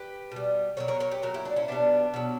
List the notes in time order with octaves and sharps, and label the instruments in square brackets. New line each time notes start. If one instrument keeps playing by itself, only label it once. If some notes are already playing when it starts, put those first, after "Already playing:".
Already playing: [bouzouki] G4 B4
B2 G3
B2 F#3 A#4 C#5
A#4 C#5
A#4 C#5
G4 B4
A#2 F#3 F#4 A#4
E4 G4
D4 F#4
C#4 E4
B2 G3 B3 D4
B2 F#3